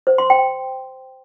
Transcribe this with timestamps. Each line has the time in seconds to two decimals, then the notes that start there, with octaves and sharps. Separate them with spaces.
0.07 C5
0.18 C6
0.30 G5